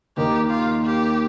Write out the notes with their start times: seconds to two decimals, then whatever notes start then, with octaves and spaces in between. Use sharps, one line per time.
0.17 D#2 D#3 A#3 D#4 G4 A#4
0.50 F4
0.85 G4